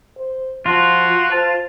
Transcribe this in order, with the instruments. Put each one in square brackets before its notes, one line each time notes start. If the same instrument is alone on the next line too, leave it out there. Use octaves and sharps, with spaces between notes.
[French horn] C5
[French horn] F3 [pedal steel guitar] F4 [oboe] F#4
[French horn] C5 [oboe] A5